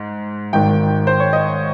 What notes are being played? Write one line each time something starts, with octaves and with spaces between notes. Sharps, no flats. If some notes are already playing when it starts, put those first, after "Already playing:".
Already playing: G#2
G#1 G#2 D#3 G5
C5
C#5
D#5